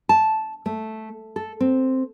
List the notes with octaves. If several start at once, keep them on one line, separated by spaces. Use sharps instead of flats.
A5
A3
A4
C4